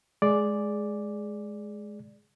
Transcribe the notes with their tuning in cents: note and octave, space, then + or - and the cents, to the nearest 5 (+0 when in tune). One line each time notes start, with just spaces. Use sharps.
G#3 +15 G#4 +5 D5 +0